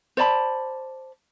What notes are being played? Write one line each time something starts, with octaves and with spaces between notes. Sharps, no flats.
C5 D5 A5 B5